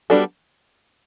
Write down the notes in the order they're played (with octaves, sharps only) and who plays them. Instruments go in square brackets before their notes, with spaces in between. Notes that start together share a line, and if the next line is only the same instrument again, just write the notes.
[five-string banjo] G3 B3 D4 F#4 A4